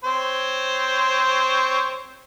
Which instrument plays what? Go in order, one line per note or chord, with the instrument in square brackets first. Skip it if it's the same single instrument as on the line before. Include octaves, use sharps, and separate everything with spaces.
[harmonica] C4 C5 C#5